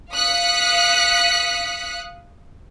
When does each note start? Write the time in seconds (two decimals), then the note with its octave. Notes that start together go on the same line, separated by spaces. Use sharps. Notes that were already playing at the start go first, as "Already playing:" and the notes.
0.12 F5 D#6 F#6 B6 C#7